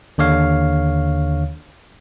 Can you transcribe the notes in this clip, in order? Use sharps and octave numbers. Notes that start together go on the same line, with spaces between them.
D#2 D3 C#5 F5